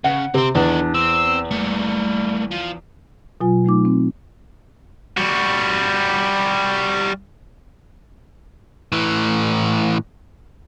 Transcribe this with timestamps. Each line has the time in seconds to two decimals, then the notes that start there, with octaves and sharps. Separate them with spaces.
0.04 C#3 F#5
0.34 C3 C4 C6
0.55 E2 D#3 D4 A4
0.94 C4 E6
1.51 G3 A3 A#3
2.51 F3
3.41 B2 F#3 F4 G#5
3.64 F#3 A3 D#4 D6
3.85 C4
5.17 G3 F#4
8.92 A2 E3